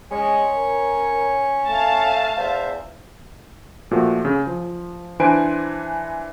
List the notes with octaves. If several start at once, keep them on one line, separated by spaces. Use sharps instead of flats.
G#3 C#4 C#5
A#4
A3 F5 A5
E2 C5 E5
A#2 F3 A3 F#4 G4
C#3
F3
E3 D4 B4 C5 G#5 D7